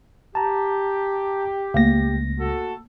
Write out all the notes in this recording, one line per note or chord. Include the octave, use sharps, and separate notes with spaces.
G4 A5 A#5
C#2 A3 A#3 A#6
F#4 A4